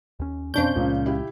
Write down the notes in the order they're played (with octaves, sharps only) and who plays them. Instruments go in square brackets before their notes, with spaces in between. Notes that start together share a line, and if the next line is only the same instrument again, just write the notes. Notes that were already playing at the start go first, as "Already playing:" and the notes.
[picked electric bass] D#2 C#4
[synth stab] F2 D4 G6 [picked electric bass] B2 [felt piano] C#4 C5
[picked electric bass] C#2 G#3 [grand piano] A#2 C#3
[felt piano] E4 G4